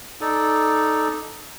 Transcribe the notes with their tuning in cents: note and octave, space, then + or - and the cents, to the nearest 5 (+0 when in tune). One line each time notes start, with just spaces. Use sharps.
D#4 +0 A4 -10 D5 +0